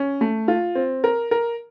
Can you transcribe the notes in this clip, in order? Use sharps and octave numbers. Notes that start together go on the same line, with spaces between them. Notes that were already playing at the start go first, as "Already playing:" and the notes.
Already playing: C#4
A3
F4
C4
A#4
A#4